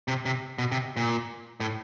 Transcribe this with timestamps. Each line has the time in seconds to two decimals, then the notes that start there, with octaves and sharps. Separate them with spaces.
0.08 C3
0.25 C3
0.58 B2
0.72 C3
0.97 A#2
1.60 A2